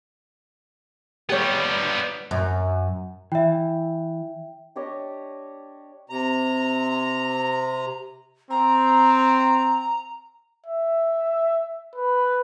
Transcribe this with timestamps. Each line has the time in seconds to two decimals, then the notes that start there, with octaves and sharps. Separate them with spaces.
1.29 G3 B3 G4 C#5
2.31 F#2
3.32 E3 E5 G5
4.76 D4 G4 C#5 D#5
6.10 C3 A#5
8.50 C4 A#5
10.66 E5
11.96 B4